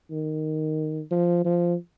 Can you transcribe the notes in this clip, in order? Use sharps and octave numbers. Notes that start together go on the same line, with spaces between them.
D#3
F3
F3